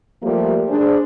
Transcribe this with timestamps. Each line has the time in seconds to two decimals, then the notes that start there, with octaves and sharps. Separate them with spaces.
0.22 F3 G3 A3 A#3
0.69 D4 G#4 C5